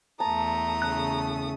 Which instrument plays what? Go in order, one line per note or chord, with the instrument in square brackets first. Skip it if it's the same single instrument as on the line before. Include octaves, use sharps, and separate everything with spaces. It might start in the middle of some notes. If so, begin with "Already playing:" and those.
[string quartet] E2 A3 D#6 [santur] A5 [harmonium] A#5
[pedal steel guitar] C#3 F#6